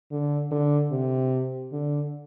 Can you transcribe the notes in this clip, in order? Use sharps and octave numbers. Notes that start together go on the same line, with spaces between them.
D3
D3
C3
D3